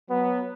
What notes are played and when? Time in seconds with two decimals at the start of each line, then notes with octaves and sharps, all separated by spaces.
0.11 F#3 B3